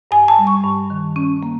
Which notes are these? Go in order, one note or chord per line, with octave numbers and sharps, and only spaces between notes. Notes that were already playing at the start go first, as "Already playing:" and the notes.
G2 G#5
A5
G3
C#6
G2
D#3
C#4
A#3